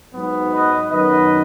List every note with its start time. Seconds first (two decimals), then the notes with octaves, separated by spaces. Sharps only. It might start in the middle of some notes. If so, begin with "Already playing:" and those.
0.14 G#2 F#3 B3
0.52 B4 D#5
0.90 F#2 D#3 F#3 B3 B4 D#5